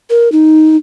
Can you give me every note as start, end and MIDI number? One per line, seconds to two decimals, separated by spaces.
0.10 0.31 70
0.32 0.77 63